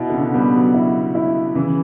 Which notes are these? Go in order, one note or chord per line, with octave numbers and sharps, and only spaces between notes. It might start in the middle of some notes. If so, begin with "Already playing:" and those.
Already playing: B2 E4
D3
C#3
G3 B3
F#3
E4
E4
C#3 E3